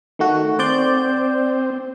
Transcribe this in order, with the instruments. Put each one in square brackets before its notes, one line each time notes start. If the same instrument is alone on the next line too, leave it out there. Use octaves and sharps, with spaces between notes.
[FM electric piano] D#3 A3 F#4
[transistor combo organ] C4 [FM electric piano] C5 D5 G6